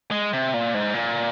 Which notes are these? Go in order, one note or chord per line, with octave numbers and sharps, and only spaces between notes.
G#3
C3
A#2
G#2
A#2